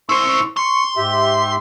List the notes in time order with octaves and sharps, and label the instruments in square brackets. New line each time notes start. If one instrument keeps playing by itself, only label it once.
[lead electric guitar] E4 C5 [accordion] C6 C#6
[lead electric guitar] C6 [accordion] C#6
[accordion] G#2 G4 E5